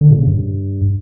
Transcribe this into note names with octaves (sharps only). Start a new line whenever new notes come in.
D3
A#2
C#3
G2